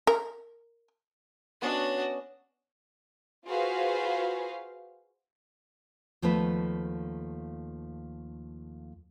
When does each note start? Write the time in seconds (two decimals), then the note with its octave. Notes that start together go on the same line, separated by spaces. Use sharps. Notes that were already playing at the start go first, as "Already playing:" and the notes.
0.07 A#4
1.62 B3 C#4 D4 F#4 D#5
3.47 F4 F#4 G#4 B4 C5 F5
6.22 D#2 F3 A3 B3 B4